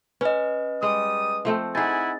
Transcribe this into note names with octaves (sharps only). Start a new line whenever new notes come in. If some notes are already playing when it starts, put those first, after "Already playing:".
C#4 B4 D#5
G3 G#3 D#6
F3 A3 C4
D#4 E4 G#4 F#5 G#5 A6